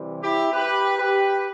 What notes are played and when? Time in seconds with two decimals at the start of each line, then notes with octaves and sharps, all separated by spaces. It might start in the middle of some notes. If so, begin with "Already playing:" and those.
Already playing: C3 E3 G3
0.22 E4 G4
0.52 G4 B4
0.98 G4 B4